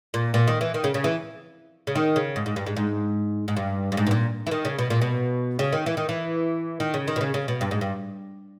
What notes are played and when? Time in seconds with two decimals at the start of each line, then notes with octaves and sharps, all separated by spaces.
0.14 A#2
0.34 A#2
0.47 D#3
0.61 E3
0.74 D#3
0.84 C#3
0.94 C#3
1.04 E3
1.87 C#3
1.95 D#3
2.16 C#3
2.36 G#2
2.46 G#2
2.56 G2
2.66 G#2
2.77 G#2
3.48 G#2
3.57 G2
3.92 G2
3.97 G#2
4.07 B2
4.11 A#2
4.47 E3
4.51 D#3
4.65 C#3
4.79 B2
4.90 A#2
5.02 B2
5.59 C#3
5.73 D#3
5.86 E3
5.97 D#3
6.09 E3
6.80 D#3
6.94 C#3
7.08 D#3
7.16 B2
7.21 C#3
7.34 C#3
7.48 B2
7.61 G2
7.71 G#2
7.81 G2